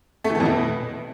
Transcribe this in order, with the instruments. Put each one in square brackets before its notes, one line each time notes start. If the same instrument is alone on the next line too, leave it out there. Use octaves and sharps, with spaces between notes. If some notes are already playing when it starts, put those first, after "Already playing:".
[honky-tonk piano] A3
E3
A3
F2
B2